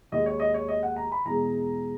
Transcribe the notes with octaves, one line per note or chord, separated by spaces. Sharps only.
D#2 D#3 G#3 D#5
C#5
D#5
C#5
D#5
F#5
A#5
B5
E2 B2 G#3 A#5